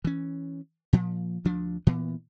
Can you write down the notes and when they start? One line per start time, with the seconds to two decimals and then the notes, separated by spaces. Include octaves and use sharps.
0.05 E3 C#4
0.93 A#2 F3
1.45 D2 F3 D4
1.87 A#2 E3 B3